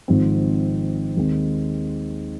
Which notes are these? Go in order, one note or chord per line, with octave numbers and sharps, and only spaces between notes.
G#1 G#2 F3 C4
D#2 D#3 G#3 C4